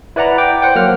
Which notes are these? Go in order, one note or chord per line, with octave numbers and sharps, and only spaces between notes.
E4 B4 D5 F#5 A#5
G5 D6
C5 F#5 G5
F#3 A#3 F6